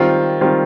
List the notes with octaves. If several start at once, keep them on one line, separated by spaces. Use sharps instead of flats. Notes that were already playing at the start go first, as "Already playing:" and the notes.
Already playing: D#3 G3 C4 F4
D#3 G3 C4 F4